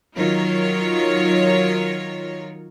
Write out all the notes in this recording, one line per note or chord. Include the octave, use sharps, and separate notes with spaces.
D#3 F#3 F4 A#4 C#5